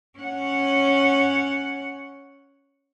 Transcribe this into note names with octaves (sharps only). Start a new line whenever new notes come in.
C#4 F#5